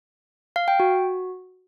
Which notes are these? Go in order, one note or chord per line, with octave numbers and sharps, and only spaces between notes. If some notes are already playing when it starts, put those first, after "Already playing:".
F5
G5
F#4